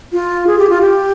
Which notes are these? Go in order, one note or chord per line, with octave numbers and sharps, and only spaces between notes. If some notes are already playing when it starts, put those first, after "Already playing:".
F4
G#4
G4
F4
G4